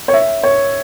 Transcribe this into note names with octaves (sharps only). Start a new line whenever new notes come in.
C#5
E5
C#5